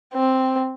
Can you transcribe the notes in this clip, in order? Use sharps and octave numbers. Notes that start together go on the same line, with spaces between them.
C4